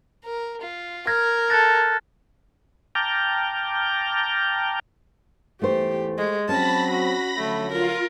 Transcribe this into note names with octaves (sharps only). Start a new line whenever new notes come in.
A#4
F4
A#4 F6 G#6 A#6
A4 F#6 A6 A#6
G5 A5 A#5 D6 F6 G6
E2 G#2 E3 A3 G4 C5
G#3
F#3 C4 C#4 A5 B5 A#6
F#4
D3 F3 F#3 A3
F4 A#4